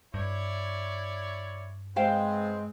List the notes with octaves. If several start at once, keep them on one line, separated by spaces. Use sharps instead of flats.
G2 E4 C#5 D5
G#3 B3 C4 C5 F5 G5